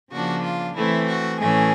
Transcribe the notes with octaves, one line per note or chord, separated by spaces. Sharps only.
C#3 F3 A#3 D4 F#4
F4
E3 A3 C4 E4
F#4
A2 E3 A3 C#4 G#4